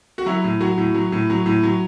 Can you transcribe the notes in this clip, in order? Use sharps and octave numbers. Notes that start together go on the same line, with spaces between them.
F#4
F#3 E4
A2
F#3 F#4
A2
F#3
A2
F#3
A2
F#3